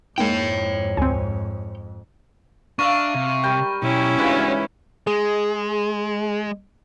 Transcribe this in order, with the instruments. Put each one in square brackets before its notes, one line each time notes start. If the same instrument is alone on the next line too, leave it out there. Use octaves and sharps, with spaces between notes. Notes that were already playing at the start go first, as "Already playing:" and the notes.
[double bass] F2 G#2 [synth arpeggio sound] G#3 A#3 D#4 [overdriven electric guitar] C#5 G5
[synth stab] D2 C4 [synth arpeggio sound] G#5
[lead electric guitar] D4 [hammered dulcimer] E5 F5 A#5 [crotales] C#6
[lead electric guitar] C3
[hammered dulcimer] G3 A#4 G5
[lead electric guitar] B1 [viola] C#4 E4
[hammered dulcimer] G#2 C#3 E3 [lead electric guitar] D4 F#4
[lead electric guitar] G#3 [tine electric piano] G#4